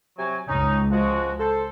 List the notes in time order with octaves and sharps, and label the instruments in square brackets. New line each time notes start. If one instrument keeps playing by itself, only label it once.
[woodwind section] C3 F#3 G#5
[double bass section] C#2 [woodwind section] C#4 D#4
[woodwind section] F3 G#3 F#4
A4 C5